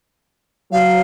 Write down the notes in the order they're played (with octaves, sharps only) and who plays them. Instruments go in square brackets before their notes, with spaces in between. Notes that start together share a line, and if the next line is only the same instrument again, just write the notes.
[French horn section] F#3 [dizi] F5